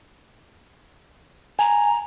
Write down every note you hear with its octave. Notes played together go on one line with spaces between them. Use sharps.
G#5 A#5